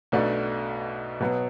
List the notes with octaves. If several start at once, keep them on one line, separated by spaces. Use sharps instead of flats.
B1 B2 A3 D4 F#4
B2 F#3 B3